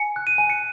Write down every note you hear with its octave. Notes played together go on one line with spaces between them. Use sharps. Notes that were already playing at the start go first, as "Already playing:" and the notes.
Already playing: G#5 C#7
F#6
D#7
G#5
C#7